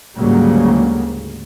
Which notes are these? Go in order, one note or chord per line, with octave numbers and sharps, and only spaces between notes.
D2 G#2 C#3 F#3 G3 A#3